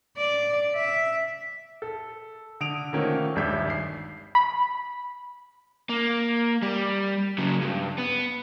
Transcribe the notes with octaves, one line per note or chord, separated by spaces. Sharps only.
D5
E5
A4
D3 D#6 D7 F7
D3 D#3 F3 A3 A#3 C#4
D#1 G#1 G2 D4 E5 G6
C7
B5
A#3
G3
C#3 F#3
G2
B3